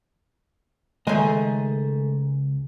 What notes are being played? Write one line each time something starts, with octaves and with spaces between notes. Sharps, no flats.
C#2 D#3 G#3 A3 D#5 G#5